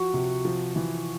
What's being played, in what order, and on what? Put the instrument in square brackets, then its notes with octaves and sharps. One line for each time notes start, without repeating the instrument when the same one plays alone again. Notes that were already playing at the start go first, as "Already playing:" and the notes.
Already playing: [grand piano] F3 [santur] F#4
[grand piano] C3
F3
E3